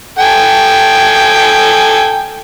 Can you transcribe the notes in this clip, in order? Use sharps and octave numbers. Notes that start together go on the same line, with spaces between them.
A4 G5 G#5